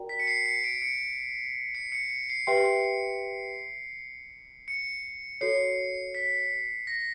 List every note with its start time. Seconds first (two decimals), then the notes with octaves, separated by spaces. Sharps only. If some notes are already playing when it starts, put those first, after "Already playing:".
Already playing: F#4 A#4 D5 G5 A#5
0.09 B6
0.20 C#7
0.27 C7
0.46 C#7
0.64 D7
0.82 C#7
1.75 C7
1.92 C#7
2.10 C#7
2.30 C7
2.47 G4 B4 E5 G5 C6 C7
4.68 C#7
5.41 F#4 A4 C#5 C7
6.15 B6
6.87 A#6